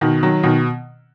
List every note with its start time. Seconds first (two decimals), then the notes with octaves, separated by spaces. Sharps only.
0.01 B2 D#3
0.23 D#3 F#3
0.43 B2 D#3